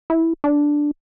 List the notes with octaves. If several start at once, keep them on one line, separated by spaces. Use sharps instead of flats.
E4
D4